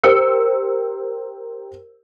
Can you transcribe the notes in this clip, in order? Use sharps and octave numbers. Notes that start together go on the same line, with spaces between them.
G4 A#4 C5 E6 C#7